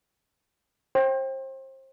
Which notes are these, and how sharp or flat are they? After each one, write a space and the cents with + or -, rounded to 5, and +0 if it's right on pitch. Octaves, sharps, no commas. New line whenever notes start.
C5 +30 G5 +0